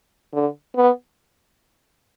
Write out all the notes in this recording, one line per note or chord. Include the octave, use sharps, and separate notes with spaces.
D3
B3